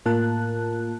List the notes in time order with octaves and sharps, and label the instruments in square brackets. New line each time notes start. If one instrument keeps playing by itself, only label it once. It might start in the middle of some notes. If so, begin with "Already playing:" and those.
[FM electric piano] A2 A#3 F4 A#4 A5 F#6